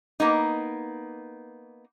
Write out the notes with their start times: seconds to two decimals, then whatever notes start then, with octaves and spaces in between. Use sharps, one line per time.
0.20 A#3 B3 D#4